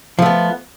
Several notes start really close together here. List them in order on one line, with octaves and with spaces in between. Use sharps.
F3 A3 B3